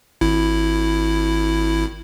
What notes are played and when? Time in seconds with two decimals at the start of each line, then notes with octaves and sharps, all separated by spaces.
0.21 G#1 E4